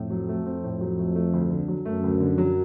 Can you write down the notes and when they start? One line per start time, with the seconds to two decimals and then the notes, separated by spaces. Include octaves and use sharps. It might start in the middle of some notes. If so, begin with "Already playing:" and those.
Already playing: F2 A2
0.10 F#3
0.29 A3
0.46 F2 C4
0.64 A2
0.81 F#3
0.99 A3
1.15 A3
1.33 D2
1.50 D3
1.68 F#3
1.85 F#2 A3
2.04 D2
2.20 D3
2.38 F#3